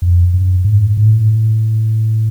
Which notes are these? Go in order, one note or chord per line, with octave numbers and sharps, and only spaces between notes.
F2
F#2
G#2
A2